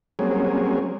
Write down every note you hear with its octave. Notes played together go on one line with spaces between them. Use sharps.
F#3 G3 A#3 C4 C#4 G#4